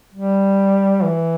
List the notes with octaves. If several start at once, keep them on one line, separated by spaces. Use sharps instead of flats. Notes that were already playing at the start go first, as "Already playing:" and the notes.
G3
E3